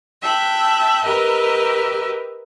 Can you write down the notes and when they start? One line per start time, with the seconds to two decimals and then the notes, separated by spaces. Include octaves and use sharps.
0.21 E5 G5 A5 F#6
1.03 G4 A#4 B4 D#5 E5